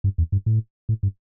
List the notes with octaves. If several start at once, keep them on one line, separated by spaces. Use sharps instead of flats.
G2
E2
G2
A2
A2
G2